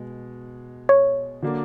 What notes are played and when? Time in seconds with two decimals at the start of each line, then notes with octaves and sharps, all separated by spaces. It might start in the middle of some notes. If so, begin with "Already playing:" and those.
Already playing: B2 G#3
0.89 C#5
1.42 D3 F#3 A#3 D4